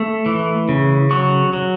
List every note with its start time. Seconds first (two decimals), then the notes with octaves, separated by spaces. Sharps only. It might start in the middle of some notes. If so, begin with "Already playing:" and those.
Already playing: A3
0.26 E3
0.69 C#3
1.11 F#3 C#6
1.53 F#3